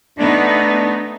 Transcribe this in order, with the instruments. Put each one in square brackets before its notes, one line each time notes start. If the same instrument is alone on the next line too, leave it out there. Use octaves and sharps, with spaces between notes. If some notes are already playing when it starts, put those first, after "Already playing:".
[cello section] A3 B3 D#4 [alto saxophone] D4